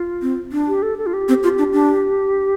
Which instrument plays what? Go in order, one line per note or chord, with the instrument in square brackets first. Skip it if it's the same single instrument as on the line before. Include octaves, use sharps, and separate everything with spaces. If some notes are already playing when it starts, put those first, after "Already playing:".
Already playing: [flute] F4
[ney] C4
D4
[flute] G4
A4
A4
F4
G4
[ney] C4
F4
D4
D4